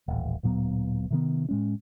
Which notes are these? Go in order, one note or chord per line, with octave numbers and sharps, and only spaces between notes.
D#1 A1
D1 A#2 F#3 B3
C3 D#3 B3
A2 G#3 C#4